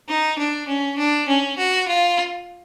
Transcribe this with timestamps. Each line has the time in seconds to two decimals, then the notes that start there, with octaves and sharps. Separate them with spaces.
0.09 D#4
0.38 D4
0.68 C#4
0.98 D4
1.28 C#4
1.58 F#4
1.88 F4